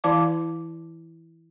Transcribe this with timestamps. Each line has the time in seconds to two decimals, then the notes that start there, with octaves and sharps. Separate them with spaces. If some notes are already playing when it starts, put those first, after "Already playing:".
0.04 E3 E4 D5 F5 A5 D6